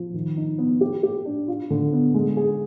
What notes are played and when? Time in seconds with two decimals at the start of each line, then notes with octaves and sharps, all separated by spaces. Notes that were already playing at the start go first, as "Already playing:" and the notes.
Already playing: F3
0.14 D#3
0.37 D#4
0.58 B3
0.81 G4
1.03 G4
1.25 D4
1.48 F4
1.70 D3
1.93 B3
2.14 G#3
2.37 G#4